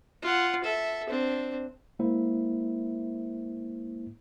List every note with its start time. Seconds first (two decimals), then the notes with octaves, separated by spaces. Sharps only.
0.22 F4 F#5
0.64 A4 E5
1.09 C4 D4
1.99 G#3 A#3 E4 C5 E5